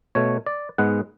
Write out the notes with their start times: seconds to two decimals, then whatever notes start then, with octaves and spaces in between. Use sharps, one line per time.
0.15 B2 A3 C#5
0.46 D5
0.78 G#2 G#3 B3 F#5